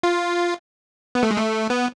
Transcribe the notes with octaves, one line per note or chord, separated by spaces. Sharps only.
F4
B3
A3
G#3
A3
B3